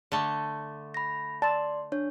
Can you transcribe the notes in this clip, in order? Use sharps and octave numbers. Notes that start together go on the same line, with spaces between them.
D3 A3
B5 A#6
D5 A5 C6
D4 C#5